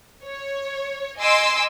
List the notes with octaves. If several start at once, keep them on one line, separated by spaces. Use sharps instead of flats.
C#5
D#5 G#5 C6 D6 E6